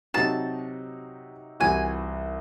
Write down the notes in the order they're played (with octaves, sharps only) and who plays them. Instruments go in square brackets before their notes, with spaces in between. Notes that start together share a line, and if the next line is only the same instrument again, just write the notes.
[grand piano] C3 F#3 C4 D#4 F#4 [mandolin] A5
[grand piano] C2 C3 E3 C4 F#4 [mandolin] G#5